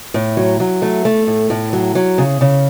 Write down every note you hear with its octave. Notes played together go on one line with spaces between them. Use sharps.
A2
F#3
F#3
A3
A3
A2
A2
F#3
F#3
C#3
C#3